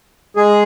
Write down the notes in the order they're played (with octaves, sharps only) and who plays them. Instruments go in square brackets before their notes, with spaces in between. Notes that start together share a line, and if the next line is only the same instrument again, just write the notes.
[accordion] G#3 G#4